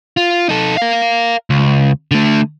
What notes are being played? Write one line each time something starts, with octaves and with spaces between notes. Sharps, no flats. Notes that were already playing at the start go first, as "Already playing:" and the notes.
F4
D#4 A4
A#4 F5
C#2
D3 A3